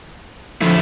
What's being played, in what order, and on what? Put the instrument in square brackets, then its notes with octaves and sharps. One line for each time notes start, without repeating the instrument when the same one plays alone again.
[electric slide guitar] D3 A3 E4 [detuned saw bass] F3